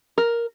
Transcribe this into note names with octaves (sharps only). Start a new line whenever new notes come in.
A#4